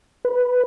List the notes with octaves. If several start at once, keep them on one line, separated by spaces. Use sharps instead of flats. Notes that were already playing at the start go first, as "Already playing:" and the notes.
B4